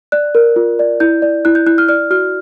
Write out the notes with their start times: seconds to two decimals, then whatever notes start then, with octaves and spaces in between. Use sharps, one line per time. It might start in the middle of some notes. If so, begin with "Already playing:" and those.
0.12 D5 F#6
0.35 A#4
0.56 F4
0.79 D5
1.00 E4 G6
1.22 D5
1.45 E4 F#6
1.55 G6
1.67 E4 F#6
1.78 F6
1.88 D5 F6
2.10 F#4 F6